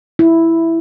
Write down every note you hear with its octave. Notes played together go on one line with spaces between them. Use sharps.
E4